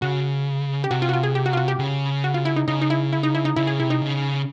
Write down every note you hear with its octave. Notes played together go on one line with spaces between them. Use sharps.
C#3 F#4
G4
C3 F#4
F4
F#4
F4
G#4
G4
F#4
F4
F#4
G4
C#3
F#4
F4
E4
D#4
C#3 D#4
D#4
E4
E4
D#4
E4
D#4
C#3 E4
G#4
C3 E4
D#4
C#3